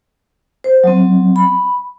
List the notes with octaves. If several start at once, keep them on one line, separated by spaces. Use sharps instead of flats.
C5
F#3 C4
B5